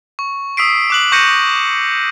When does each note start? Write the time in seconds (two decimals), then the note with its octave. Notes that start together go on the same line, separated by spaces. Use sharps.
0.19 C#6
0.57 D#6 E6 B6 C7 D7
0.90 D6 F#6 F#7
1.12 C#6 G6 A#6 C#7 D#7